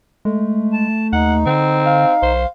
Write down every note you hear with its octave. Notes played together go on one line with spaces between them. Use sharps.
G#3 A3
A5
D#2 D#4 F#5
D3 C4
F5
B1 C5